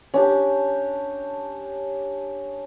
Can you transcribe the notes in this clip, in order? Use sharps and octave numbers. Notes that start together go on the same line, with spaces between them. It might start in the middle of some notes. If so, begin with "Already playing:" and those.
C#4 D4 G4